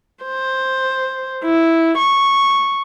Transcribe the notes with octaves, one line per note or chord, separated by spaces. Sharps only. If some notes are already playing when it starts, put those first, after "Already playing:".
C5
E4
C#6